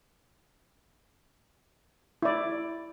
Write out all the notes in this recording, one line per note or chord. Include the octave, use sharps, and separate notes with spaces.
E4 D5